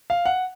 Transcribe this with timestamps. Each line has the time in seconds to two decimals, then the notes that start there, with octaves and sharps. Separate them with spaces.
0.10 F5
0.25 F#5